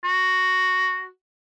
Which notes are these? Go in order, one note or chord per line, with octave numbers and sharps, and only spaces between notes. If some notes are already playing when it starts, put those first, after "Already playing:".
F#4